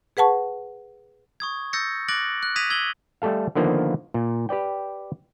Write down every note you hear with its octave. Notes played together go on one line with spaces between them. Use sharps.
G#4 B4 F#5 A5 C#6
C#6 D#6 G#6
E6 G6 A6 A#6 C#7
D6 F#6 A6 A#6 D7 F#7
F#6
D#6 G#6 A#6 B6 D#7 F7
E6 G#6 F#7 G7
G3 A3 A4 F5
D3 D#3 F3 A#3 B3
A#2
G4 B4 D5 G5